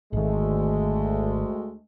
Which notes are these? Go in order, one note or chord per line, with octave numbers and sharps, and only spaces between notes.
G#1 D2 D#3 G#3 A3